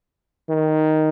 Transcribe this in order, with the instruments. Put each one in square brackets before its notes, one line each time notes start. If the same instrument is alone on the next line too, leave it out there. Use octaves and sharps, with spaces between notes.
[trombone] D#3